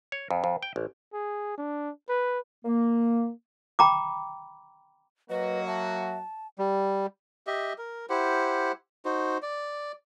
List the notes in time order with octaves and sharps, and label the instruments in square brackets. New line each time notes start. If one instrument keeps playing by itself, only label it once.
[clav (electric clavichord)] C#5
F2
F2
G5
A1
[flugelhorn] G#4
D4
B4
[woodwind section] A#3
[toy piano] G5 A#5 B5 D6
[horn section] F#3 A#3 F#4 [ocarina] B4 [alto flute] D#5
[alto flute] E5 [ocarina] A5
[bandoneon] G3
[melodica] G4 D#5 E5
A#4
E4 G4 C5 F#5
D#4 F#4 C5
D5